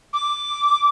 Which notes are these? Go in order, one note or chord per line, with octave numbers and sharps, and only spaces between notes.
D6